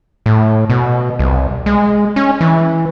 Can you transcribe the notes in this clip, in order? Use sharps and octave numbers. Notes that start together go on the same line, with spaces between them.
A2
B2
C2
G#3
C#4
E3